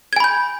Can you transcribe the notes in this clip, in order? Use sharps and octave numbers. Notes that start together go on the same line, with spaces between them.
G#5 B5 G6 G#6